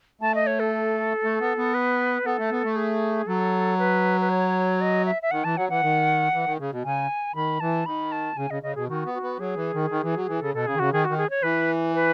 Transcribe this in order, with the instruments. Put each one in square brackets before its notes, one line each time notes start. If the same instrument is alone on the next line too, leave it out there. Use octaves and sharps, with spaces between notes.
[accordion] A3 [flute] A5
[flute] D#5
C#5
A4
[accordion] A3
B3
B3
[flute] B4
[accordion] B3 [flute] A4
[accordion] A3
B3
A3
[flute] G#4
[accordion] F#3 [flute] A4
[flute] B4
B4
C#5
D#5
E5
E5
[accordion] D#3 [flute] F#5
[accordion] E3 [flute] A5
[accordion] F#3 [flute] F#5
[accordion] E3 [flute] F#5
[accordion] D#3
E3
D#3
C#3
B2
[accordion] C#3 [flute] G#5
[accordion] D#3 [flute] B5
[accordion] E3 [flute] A5
[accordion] D#3 [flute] B5
[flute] A5
[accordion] C#3 [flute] G#5
[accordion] C#3 [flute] D#5
[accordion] C#3 [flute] D#5
[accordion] B2 [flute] G#4
[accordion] D#3 [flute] F#4
[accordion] B3
[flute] F#4
[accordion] B3
[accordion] F#3 [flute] G#4
[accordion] E3
D#3
D#3
E3
F#3
E3
[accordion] C#3 [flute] A4
[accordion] B2 [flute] A4
[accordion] C#3 [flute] G#4
[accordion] D#3
[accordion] C#3 [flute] F#4
[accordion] D#3 [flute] G#4
[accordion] D#3 [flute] F#4
[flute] G#4
C#5
[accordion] E3 [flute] B4
[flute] B4